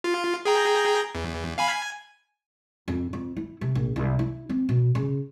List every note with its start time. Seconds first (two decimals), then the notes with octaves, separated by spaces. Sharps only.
0.04 F4
0.45 G#4 G5 A#5
1.15 E2
1.58 F5 G#5 B5
1.72 G#5
2.88 F2
3.13 F2
3.37 E4
3.61 C3
3.75 A#1
3.96 C2
4.19 E4
4.49 C4
4.69 B2
4.95 C#3